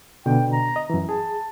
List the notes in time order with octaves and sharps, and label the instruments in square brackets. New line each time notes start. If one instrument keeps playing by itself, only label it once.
[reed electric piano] B2 D3 [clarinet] G5
[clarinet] A#5
[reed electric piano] D#5
F#2 E3
[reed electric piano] G#4 [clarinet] A5